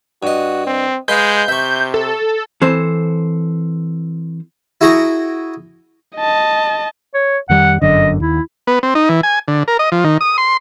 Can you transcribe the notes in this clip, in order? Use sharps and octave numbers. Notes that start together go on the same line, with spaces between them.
G2 F#4 D#5
C4
G#3 B4 D#5 F5 G6
C3 E5 C#6
A4
E3 C4 A4 C5
E4 F#4 G#4 G5 A#5 C#6
D#5 A5
C#5
F2 D#3 G3 F#5
G1 F#2 D3 D#5
D#2 E4
B3
C4
D#4
E3
G#5
D3
A#4
D#5
F3
D#3
D#6
C6